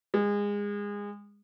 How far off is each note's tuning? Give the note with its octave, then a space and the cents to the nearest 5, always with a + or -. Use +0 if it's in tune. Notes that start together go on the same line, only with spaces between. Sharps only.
G#3 -25